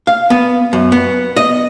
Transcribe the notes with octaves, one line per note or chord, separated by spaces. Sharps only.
F5
B3
F#2
B3
D#5